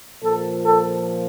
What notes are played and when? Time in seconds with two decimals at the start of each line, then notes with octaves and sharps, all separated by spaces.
0.22 A#2 F3 A4
0.65 A4